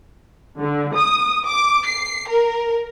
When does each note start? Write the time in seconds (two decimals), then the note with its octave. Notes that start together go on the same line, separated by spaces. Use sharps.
0.58 D3
0.95 D#6
1.46 D6
1.87 C7
2.28 A#4